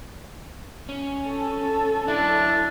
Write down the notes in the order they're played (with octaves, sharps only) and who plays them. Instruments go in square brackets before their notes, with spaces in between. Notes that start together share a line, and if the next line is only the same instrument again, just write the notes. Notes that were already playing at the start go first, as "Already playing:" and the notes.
[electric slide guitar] C#4
[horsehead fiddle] A4
[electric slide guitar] F#3 E4 [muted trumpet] D4